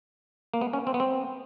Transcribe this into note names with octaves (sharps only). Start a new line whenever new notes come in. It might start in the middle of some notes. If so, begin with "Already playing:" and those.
A#3
B3
C#4
C4
B3
C4